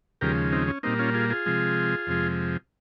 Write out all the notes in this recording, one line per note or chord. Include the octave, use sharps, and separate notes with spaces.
D#2 C#3 F3 G#3 G4 A#4
C4 D#4
C#4
A#2 G3 A#3 C4 D#4
C#4 F4
F4 G#4
F4 G#4
C3 F3 G#3
F2 C3 F3 G#3